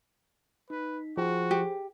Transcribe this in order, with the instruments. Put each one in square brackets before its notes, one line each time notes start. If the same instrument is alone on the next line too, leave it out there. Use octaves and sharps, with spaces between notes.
[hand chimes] D#4 B6 [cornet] B4
[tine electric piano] F3 [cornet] F#4 [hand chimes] G#4 C5 G5
[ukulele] G4